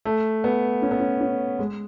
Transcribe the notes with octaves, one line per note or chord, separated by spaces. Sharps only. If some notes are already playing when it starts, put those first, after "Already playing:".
A3
B3
C#4
B3
C#4
C#4
G#3